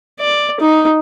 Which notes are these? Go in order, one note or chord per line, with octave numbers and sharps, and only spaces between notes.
D5
D#4